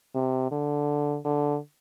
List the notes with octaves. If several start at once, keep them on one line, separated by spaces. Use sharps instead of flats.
C3
D3
D3